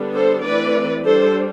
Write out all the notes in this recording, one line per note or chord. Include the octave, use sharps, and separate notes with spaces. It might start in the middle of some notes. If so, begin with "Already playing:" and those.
Already playing: D3 G3 B3 D4
A4 C5
E3 A3 C4 B4 D5
G3 D4 A4 C5